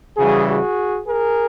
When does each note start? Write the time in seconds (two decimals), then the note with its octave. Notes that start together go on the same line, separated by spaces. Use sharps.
0.17 C#3 E3 G3 F#4 G#4
0.47 F#4 G#4
1.07 G#4 A#4